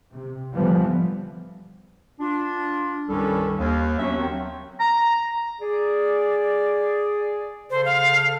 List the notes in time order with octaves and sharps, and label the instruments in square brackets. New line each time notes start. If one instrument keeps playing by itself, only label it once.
[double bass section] C3
A2 D3 E3 F3 G3 B3
[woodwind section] D4 F4
C2 G2 D#3 G3 C#4 A4
D#2
F#3 B3 C#4 D4 F#4 E5
D#3 F#3 C4
[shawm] A#5
[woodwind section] G#4 D5
[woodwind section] C#3 A4 [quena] C5
[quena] F5